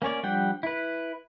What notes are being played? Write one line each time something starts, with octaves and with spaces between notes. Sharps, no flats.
A#3 C#4 C#5 D5
F3 G3 D4 F#5 G5
E4 B4